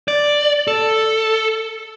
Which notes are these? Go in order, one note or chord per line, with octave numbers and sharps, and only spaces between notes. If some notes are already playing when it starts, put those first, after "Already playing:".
D5
A4